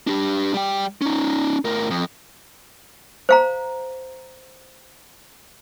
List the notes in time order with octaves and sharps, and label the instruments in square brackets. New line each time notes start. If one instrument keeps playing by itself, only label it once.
[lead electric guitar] D4 G4
G3 G5
C#4 D#4
A2 A#4
F2
[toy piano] C5 F5 A#5